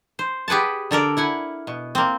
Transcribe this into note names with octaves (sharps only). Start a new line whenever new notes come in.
C5
G4 G#4 B4 F#5 A5
D3 A4 A#4 D5
E4 F#5 G#5
B2
A#3 C4